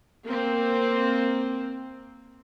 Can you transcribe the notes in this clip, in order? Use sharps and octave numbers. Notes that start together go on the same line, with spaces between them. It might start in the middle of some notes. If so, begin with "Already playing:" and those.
A#3 C4